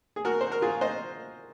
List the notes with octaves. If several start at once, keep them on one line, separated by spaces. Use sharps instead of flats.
G#4
F#4 A#4
C5
A#4
F4 G#4
C5 D#5